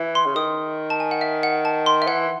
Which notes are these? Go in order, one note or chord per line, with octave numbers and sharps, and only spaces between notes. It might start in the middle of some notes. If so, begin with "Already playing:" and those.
Already playing: E3
C6
C#3
D#3 D#6
A5
G#5
F#5
E5
F#5
A5
C6
E5
E3 F#5